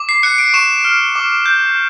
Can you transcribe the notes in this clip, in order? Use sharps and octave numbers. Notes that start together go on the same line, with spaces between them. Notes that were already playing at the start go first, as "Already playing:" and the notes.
Already playing: D6
C7
F#6 C#7
D7
C#6 E7
F6
D6
G6